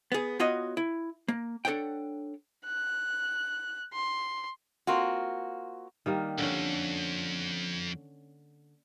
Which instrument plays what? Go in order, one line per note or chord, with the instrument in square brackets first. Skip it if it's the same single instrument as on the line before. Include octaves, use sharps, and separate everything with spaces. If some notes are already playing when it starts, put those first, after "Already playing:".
[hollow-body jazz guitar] B3 G#4
B3 F4 F#4 C#5 D#5
E4
A#3
D4 A4 C#5 F#5 G5
[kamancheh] F#6
C6
[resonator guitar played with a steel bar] A#3 C4 F4 F#4
[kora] D#3 G3 A#3
[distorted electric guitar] C2 F2 [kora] D3 C#4